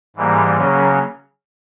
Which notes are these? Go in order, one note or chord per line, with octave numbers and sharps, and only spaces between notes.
G#2 E3 G3 A#3
C#3 F#3 A#3 C#4